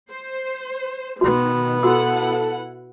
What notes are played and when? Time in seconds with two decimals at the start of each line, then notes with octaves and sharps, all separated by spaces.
0.11 C5
1.21 B2 D#3 B3 F#4
1.83 E4 F#4 A4 B4 F#5 E6